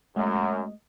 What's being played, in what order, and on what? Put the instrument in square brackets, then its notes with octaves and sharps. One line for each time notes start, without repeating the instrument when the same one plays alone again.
[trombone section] F#2 [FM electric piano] G#3 A3 D#5